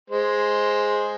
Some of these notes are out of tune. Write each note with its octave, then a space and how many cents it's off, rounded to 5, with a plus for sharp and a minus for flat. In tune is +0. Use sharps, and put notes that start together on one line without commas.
G#3 +0 C5 +0